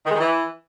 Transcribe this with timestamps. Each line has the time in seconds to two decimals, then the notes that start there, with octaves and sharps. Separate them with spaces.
0.04 D#3
0.09 G#3
0.14 D#3
0.19 E3